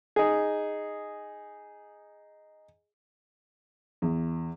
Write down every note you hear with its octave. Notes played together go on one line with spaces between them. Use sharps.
D#4 G#4
E2